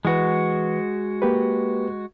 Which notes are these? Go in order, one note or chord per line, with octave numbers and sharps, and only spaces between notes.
E3 G#3 F#4 B4
A#3 G4 B4